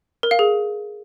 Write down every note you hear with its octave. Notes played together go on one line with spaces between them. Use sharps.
A#4
F5
G#4